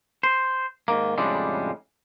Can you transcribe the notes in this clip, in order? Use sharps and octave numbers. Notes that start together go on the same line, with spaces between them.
C5
G#2 D#3 A#3
F2 A2 C#3 G3 G#3 D4